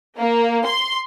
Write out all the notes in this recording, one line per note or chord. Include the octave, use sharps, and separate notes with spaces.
A#3
C6